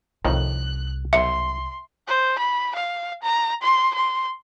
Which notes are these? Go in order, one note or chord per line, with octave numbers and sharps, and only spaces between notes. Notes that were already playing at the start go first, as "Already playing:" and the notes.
C2 F2 A2 D#3 F#6
B1 E5 C6
C5
B5
F5
A#5
C6
C6